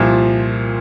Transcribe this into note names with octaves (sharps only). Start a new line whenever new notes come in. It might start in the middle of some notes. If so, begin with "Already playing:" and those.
Already playing: C2 A#2 F3